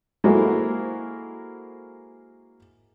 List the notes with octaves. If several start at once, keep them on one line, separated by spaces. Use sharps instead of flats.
G#3 A#3 E4 F#4 A4 C5